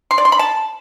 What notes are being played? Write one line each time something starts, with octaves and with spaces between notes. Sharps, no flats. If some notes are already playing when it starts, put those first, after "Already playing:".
C6
D5
C6
B5
A5